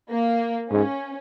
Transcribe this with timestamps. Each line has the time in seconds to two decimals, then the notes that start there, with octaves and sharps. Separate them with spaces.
0.10 A#3
0.71 G#2 C#4